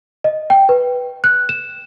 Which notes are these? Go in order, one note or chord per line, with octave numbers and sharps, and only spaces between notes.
D#5
G5
B4
F#6
E7